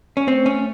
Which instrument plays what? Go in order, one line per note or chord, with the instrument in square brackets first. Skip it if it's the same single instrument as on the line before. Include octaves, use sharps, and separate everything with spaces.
[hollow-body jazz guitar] C#4
[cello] A3 [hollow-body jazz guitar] C4
[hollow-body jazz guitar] C#4